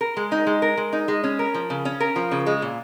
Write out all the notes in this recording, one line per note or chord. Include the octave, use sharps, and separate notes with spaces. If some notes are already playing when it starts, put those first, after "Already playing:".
A#4
G#3
D#4
G#3
A#4
G#3
D#4
G#3
C#4
A#4
F3
C#3
C#4
A#4
F3
C#3
G#3
A#2